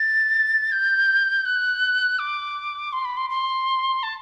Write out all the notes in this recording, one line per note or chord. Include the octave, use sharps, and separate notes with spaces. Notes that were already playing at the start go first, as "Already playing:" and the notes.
Already playing: A6
G6
F#6
D6
C6
B5
C6
C6
A5